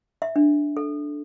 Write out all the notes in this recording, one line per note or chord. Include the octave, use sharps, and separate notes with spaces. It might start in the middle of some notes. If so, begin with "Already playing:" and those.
E5
D4
A4